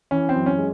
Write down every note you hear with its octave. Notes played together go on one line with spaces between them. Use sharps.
E3 C#4
C4
F#2
C#4
G#3